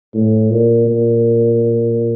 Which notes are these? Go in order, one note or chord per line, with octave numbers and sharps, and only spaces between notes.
A2
A#2
A#2